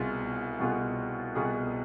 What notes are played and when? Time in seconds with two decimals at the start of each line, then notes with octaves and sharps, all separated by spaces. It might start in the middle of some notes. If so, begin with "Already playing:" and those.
Already playing: C2 B2 B3 F4 G#4
0.59 C2 B2 B3 F4 G#4
1.35 C2 B2 B3 F4 G#4